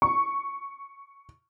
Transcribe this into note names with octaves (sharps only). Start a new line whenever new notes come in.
C#6